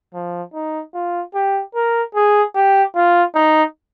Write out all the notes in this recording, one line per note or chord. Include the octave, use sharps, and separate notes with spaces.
F3
D#4
F4
G4
A#4
G#4
G4
F4
D#4